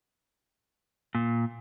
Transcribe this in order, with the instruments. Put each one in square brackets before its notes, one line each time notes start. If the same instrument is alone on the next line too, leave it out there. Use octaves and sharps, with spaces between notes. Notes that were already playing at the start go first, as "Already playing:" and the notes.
[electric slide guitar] A#2